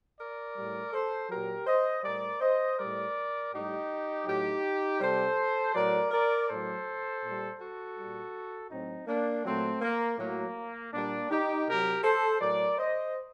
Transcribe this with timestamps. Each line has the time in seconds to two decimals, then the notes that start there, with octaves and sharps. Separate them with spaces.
0.19 A#4 D5
0.56 A2 G3
0.93 A4 C5
1.30 A#2 F#3 G4 A#4
1.67 C5 D#5
2.04 A2 G3 A#4 D5
2.41 C5 D#5
2.78 A2 G3 A#4 D5
3.52 A2 G3 D#4 G4
4.26 A2 F#3 D#4 G4
5.00 C3 G3 A4 C5
5.74 A2 F#3 A#4 D5
6.11 A#4 D5
6.48 A2 F#3 A4 C5
7.23 A#2 G3
7.59 F#4 A4
7.96 A#2 G3
8.71 A2 F#3 C4 D#4
9.08 A#3 D4
9.44 A#2 F#3 A3 C4
9.82 A#3
10.19 A2 F#3 A#3
10.93 A#2 G3 A#3 D4
11.30 D#4 G4
11.67 C3 F#3 G4 A#4
12.04 A4 C5
12.41 A2 F#3 A#4 D5
12.78 C5 D#5